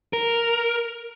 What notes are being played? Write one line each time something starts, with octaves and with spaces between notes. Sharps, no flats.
A#4